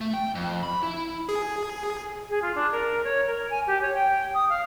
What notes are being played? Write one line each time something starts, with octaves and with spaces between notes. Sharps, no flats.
A3
G5
F2
B5
E4
G#4
G#4
F4
D4
A#4
C#5
A#4
G#5
G4
C#5
G5
D#6
F5